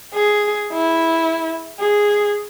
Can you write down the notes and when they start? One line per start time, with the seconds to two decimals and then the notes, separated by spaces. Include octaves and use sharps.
0.14 G#4
0.72 E4
1.80 G#4